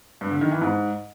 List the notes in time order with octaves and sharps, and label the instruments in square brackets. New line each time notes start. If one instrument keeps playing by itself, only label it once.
[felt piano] G2
D3
D#3
E3
G#2